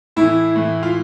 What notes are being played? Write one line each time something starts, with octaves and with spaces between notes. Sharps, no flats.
A2 E3 E4
A2 E3
F4